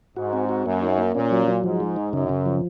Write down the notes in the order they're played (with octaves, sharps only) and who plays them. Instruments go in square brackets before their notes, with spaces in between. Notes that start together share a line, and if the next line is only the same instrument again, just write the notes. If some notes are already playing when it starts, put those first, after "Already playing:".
[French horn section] G#2 [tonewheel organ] F#4
[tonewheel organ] C4
F#4
[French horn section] F#2 [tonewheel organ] A#3
[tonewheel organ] D#4
A#3
[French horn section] A#2 [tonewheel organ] C#4
[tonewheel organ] F#3
F#3
[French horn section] G#2 [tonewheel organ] F3
[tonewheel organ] G#3
D#4
[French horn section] F#2 [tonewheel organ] C#3
[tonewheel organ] C#3
F3